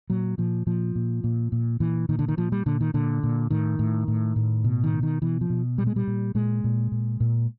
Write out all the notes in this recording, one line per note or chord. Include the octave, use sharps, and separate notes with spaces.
A#2 F#3
A#2 F3
A#2 F3
A#2
A#2
A#2
A#2 E3
A#2 D#3
D3
D#3
A#2 F3
G3
A#2 D3
D#3
A#2 D3
A#2
A2 D#3
A2
A2
A2
B2
D#3
B2
D#3
B2 E3
F3
B2
A#2 G3
G#3
G3
A#2
A#2 G#3
A#2
A#2
A#2